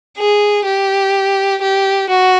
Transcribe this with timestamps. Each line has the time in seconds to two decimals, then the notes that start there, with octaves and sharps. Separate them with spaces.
0.17 G#4
0.65 G4
1.61 G4
2.09 F#4